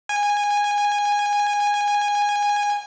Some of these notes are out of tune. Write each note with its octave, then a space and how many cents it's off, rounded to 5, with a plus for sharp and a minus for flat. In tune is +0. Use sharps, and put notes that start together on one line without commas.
G#5 -15